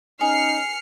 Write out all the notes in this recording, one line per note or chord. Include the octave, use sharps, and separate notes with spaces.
C#4 D#4 G#4 F6 C7 C#7